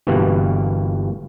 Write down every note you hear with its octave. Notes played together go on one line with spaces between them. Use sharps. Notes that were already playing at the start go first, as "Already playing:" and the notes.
G1 G2 B2 E3 A#3 F#5